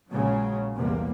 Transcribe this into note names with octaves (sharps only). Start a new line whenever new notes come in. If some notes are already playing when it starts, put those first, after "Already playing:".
A#1 C#3 F#3 G#3
B1 E2 C3 G3 A#3